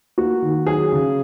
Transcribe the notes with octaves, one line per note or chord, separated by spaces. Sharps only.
A#3 F#4
D#3
F#3 G#4
C#3